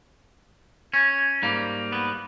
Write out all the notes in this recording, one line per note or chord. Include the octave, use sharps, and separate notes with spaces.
C#4
G#2 G3 A#3
B3